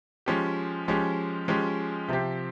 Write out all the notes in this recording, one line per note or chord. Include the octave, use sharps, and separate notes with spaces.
F3 G#3 C#4 G4
F3 G#3 C#4 G4
F3 G#3 C#4 G4
C3 F3 C4 G4